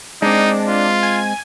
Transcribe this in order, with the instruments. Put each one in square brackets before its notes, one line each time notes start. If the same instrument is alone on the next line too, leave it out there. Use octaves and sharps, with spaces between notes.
[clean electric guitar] G#3 C4 [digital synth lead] D4 [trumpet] D#4
[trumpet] F4
[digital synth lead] G#5